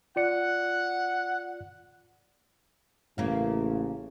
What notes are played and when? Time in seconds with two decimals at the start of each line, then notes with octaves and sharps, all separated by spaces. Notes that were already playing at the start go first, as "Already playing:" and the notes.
0.16 F4 D5 F#5 C#7
3.18 A1 C#3 A#3